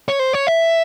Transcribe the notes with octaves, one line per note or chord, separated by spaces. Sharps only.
C#5
C5
C#5
E5